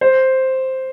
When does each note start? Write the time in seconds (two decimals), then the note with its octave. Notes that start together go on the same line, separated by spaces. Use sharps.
0.01 C5